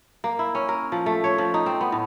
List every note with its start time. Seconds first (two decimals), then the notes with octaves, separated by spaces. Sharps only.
0.24 A#3
0.39 E4
0.55 C#4
0.69 A#4
0.92 F3
1.06 A3
1.24 C#5
1.38 F3
1.54 D#4
1.66 C4
1.81 B3
1.92 A2